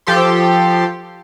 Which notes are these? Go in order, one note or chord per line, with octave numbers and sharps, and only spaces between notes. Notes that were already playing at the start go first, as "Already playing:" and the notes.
F3 G4 A4 C6